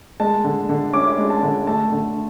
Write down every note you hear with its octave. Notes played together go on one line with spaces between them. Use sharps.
G#3 A5
D3
D3
C#4 D6
G#3
A5
D3
A3 A5
D3